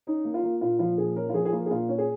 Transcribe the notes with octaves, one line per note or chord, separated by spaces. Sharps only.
C#4 D#4
A#3
F4
A#3
A#2 F4
F3 F4
A#2 G#4
C#4 A#4
F4
F3 G#4
G#4
A#3 F4
G#4
A#2 F4
C#4
G#4